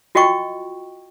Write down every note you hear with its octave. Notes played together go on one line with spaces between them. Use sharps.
F4 F#4 D#5 G5 C#6 D6